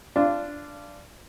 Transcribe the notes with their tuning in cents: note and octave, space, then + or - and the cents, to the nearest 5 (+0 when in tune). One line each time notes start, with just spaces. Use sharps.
D4 -5 F4 -25